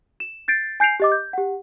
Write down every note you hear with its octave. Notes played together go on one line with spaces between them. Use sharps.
E7
G6 A6 C7 D7
G#5 G6 C7 D7 F7
G4 D#5 D6
G6
G4 F#5